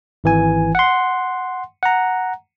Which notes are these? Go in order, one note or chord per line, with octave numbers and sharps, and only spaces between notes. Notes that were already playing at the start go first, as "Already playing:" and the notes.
G#1 E3 G#5
F#5 C6
F#5 A#5